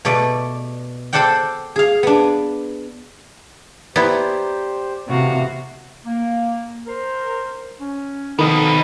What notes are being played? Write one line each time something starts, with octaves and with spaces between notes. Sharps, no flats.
B2 A3 D5
A4 C5 D5 F#5 G5
G#4 F5
B3 D4
B3 E4 G4 C5 D5 A#5
E2 A2 C3 E3 F#4 F5
A#3
A#4 C5 C6
C#4
D3 D#3 F3 B3 D#4